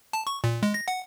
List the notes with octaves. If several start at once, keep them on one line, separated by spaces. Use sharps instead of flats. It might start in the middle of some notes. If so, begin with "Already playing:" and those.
A5
C#6
A#2
G#3
A#6
F#5